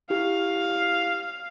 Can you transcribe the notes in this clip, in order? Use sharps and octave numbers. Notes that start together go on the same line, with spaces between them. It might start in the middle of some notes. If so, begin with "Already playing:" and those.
E4 G4 F5